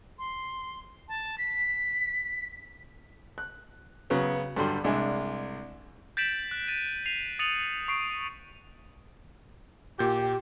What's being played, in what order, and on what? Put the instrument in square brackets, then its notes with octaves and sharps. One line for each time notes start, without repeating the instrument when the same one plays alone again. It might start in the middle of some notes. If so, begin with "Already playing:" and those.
[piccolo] C6
A5
B6
[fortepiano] F#6
C#3 F#3 B3 C#4
G2 D3 F#3 G3 C6
C2 G#3 D4 E5 G#5
[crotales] G6 A6 B6 D7 E7 F#7
F#6
A6 D#7
C7 D#7 F7
D#6 A6 C#7 D#7 F7 F#7
C#6 C7 D7
[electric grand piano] A#2 G6 [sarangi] G4